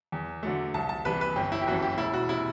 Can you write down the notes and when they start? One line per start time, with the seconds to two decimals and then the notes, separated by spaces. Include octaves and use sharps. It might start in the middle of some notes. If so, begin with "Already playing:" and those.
0.12 E2
0.43 D3 F#3 A3
0.74 C2 A5
0.89 A5
1.05 C3 E3 G3 B4
1.21 B4
1.36 G1 G4
1.52 E4
1.61 G4
1.67 F#2 E3 F#4
1.82 G4
1.98 E1 E4
2.13 F#4
2.29 C3 E4